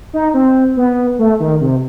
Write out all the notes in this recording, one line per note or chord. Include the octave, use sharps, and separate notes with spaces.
D#4
C4
B3
A3
D#3
C3